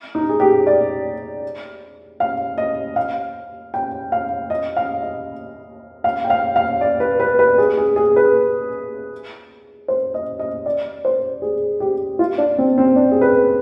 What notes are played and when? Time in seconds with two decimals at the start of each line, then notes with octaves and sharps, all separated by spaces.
0.15 D#4
0.29 G#4
0.40 G4
0.67 D5
2.20 F5
2.58 D#5
2.96 F5
3.74 G5
4.12 F5
4.50 D#5
4.76 F5
5.02 D#5
6.04 F5
6.25 G5
6.30 F5
6.56 F5
6.81 D5
7.00 B4
7.20 B4
7.39 B4
7.58 G#4
7.77 G#4
7.96 G#4
8.16 B4
9.88 C5
10.14 D#5
10.39 D#5
10.66 D5
11.05 C5
11.42 G#4
11.80 G4
12.19 F4
12.38 D4
12.58 C4
12.78 C4
12.96 D4
13.11 G#4
13.21 B4